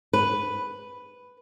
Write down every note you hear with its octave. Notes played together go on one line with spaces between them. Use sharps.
B4